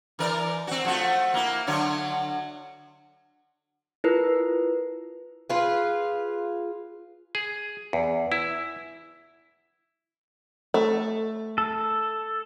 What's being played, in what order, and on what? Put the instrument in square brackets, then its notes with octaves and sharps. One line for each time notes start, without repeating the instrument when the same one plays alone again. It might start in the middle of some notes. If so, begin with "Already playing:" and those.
[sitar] E3 A#4 D5
C4 F#4
F3 A3 F#4
A#3 E4
D3 F#3 C#5
[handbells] E4 F4 A#4 B4
[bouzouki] F4 G#4 B4
[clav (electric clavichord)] G#4
E2
E4
[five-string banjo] A3
[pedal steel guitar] A4